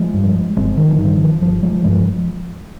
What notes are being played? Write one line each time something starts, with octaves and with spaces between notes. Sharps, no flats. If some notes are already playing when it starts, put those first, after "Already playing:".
Already playing: F3 G#3
G2
G1 G#3 C4
D#3
F3
G2 D#3
F3
G1 F3
F3 G#3
G2 F3 G#3